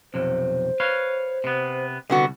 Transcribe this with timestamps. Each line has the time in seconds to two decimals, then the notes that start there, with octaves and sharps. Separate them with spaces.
0.14 B1 F2 C3 C5
0.80 B4 C#5 F5
1.44 C3 B3
2.10 C2 D3 B3 F#4